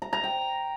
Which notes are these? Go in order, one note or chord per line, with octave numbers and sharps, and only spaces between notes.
A#5
A#5
G5